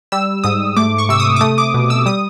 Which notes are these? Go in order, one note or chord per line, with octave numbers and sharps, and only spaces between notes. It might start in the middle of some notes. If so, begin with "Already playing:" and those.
G3 E6
G#2 D#6
A3 D6
C#6
C3 E6
D#6
D6
A3 D#6
D6
B2
E6
G3 D#6